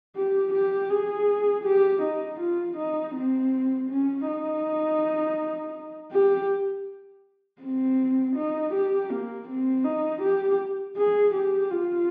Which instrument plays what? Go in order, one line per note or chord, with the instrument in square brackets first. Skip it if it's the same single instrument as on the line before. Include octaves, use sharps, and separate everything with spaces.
[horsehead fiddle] G4
G4
G#4
G4
D#4
F4
D#4
C4
C#4
D#4
G4
C4
D#4
G4
A#3
C4
D#4
G4
G#4
G4
F4